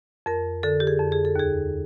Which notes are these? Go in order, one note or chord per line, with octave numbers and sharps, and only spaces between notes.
F2 A#4
D3 A4
G4
G#4
F2
G#4
A4
D#2 G#4